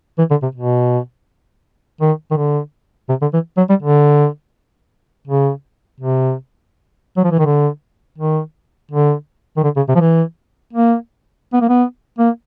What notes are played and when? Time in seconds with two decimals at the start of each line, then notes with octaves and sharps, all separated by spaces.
0.18 E3
0.30 D3
0.43 C3
0.55 B2
2.01 D#3
2.31 D#3
2.37 D3
3.09 C3
3.22 D3
3.34 E3
3.57 F#3
3.69 G3
3.82 D3
5.28 C#3
6.00 C3
7.17 F#3
7.24 F3
7.31 E3
7.39 D#3
7.46 D3
8.18 D#3
8.91 D3
9.57 D#3
9.64 D3
9.76 C#3
9.89 C3
9.95 F3
10.00 E3
10.73 A#3
11.53 B3
11.61 A#3
11.69 B3
12.18 A#3